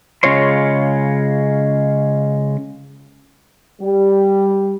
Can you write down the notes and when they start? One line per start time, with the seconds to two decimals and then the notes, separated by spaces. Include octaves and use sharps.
0.23 C#3 G#3 F4 C#5 C6
3.82 G3